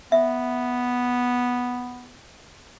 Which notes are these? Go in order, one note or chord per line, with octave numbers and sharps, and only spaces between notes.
B3 E5